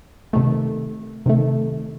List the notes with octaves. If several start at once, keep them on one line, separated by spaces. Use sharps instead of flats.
C3 D#3 A3
C3 D#3 A3